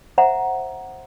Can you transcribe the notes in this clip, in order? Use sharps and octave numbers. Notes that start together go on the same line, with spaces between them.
C5 E5 F#5 A#5